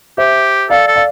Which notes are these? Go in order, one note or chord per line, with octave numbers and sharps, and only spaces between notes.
G4 C5 E5
A4 D5 F5
A4
D5 F5